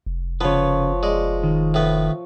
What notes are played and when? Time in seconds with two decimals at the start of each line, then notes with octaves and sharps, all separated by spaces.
0.06 F1
0.41 C#3 F3 B3 F4 B4 C#5
1.03 G#3 D5
1.43 D#3
1.74 A2 B3